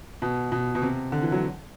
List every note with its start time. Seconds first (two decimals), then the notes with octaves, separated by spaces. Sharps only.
0.22 B2
0.52 B2
0.75 B2
0.82 C3
1.12 D3
1.22 E3
1.32 F#3